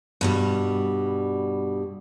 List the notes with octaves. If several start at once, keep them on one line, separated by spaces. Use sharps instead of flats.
G2 B2 G3